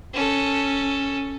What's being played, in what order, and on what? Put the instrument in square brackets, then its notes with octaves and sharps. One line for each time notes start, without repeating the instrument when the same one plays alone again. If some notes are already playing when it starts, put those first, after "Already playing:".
[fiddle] C#4 A4